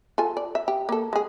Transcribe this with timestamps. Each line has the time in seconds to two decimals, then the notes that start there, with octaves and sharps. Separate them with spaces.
0.18 F4 A4 G#5
0.37 D5
0.55 E5
0.68 G4
0.89 A#3 A4
1.13 G#3 G#4